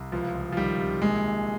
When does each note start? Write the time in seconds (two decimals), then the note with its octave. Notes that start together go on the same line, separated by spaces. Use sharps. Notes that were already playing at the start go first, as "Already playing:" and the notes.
Already playing: C2
0.12 C#2 F3
0.35 C#2
0.52 F3
0.57 D#3 G3
0.79 C3
1.02 A#1 G#3
1.24 A#1